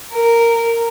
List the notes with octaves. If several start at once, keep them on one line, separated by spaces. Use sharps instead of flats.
A#4